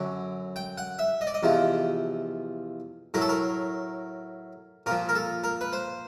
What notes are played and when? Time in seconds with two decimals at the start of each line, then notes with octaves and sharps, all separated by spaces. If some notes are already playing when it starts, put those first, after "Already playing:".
Already playing: F#2 D3 F#3
0.56 G5
0.78 F#5
0.99 E5
1.21 D#5
1.27 D5
1.34 D#5
1.43 E2 C3 F3
3.14 A2 F#3 A#4
3.21 A4
3.29 A#4
4.86 A#2 F3 A#4
5.09 A#4
5.15 A4
5.44 A#4
5.61 B4
5.73 C5